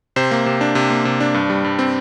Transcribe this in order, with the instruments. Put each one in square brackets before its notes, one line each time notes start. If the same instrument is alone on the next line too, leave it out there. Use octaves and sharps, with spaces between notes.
[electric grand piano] C3 C5
A#3
C3
D4
C3
A#3
C3
D4
G2
G3
G2
C4